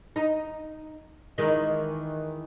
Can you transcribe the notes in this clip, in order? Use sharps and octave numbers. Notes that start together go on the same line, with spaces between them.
D#4
D#3 E3 G#3